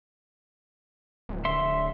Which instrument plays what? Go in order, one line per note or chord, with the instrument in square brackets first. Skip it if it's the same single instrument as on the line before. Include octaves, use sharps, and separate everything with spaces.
[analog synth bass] D1
[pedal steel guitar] E5 C6